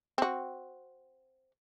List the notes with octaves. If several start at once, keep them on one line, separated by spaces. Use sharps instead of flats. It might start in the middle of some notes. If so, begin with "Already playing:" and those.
C4 F#4